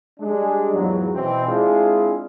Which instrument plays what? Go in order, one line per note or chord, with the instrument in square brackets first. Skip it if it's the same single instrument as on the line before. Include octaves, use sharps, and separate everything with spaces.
[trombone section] G3 G#3 D4
E2 G#2 F3 F#3
B2 E3 C4
G#3 C4 D4 E4 F4 G#4